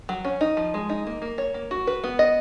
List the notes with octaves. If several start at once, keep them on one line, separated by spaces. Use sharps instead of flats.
F#3
C#4
D#4
F3
G#3
D#4
A#3
A#3
C#5
A#3
F#4
B4
B3
D#5